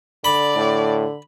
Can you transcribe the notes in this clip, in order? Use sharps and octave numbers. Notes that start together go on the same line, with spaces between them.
D3 D5 B5
A2